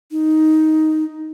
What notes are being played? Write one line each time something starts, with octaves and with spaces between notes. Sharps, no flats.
D#4